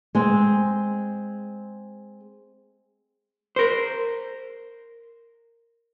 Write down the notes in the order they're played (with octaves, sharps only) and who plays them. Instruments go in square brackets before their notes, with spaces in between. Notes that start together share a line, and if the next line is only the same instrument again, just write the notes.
[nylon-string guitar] G#3 C4
[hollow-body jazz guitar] A#4 C5